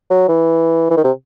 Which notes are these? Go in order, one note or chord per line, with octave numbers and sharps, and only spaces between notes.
F#3
E3
E3
D#3
C3